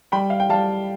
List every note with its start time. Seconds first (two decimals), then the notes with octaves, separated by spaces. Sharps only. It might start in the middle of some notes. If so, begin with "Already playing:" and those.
0.12 G3 G5 B5
0.30 F5
0.40 G5
0.49 G3 F5 A5